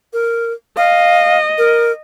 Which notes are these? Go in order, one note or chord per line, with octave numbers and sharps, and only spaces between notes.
A#4
D#5 F5
A#4